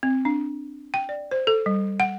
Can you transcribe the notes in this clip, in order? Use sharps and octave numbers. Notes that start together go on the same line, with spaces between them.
C4
D4
G5
D5
C5
A4
G3
F#5